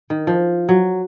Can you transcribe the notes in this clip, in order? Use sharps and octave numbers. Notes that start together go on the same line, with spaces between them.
D#3
F3
F#3